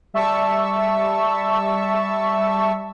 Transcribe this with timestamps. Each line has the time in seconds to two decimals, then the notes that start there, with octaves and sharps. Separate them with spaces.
0.14 G3 E5 A5 C#6 E6